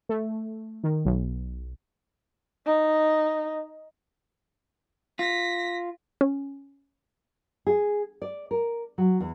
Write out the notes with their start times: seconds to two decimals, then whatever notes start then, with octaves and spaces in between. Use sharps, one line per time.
0.09 A3
0.84 D#3
1.05 B1
2.66 D#4
5.19 F4 A#6 B6
6.21 C#4
7.67 G#4
8.22 D5
8.51 A#4
8.98 F#3
9.20 E2